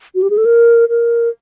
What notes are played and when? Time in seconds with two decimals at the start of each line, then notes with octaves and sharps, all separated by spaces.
0.15 F#4
0.22 G4
0.30 G#4
0.38 A4
0.45 A#4
0.89 A#4